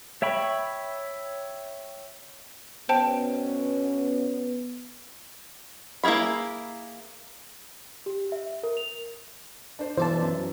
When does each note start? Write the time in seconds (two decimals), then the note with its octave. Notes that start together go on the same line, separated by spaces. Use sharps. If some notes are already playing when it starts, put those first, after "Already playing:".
0.22 C#5 E5 G5 B5 C#6
2.89 B2 D3 B3 C#4 C5 G5 A5
6.04 A#3 E4 F4 G#4 B5
8.06 G4
8.32 E5
8.63 A#4
8.77 F7
9.79 D4 C5
9.97 B1 E3 C5 D5 A5
10.21 F#2